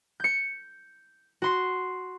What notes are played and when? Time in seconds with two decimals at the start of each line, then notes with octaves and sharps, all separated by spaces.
0.20 G6 C#7
1.42 F#4 C6 C7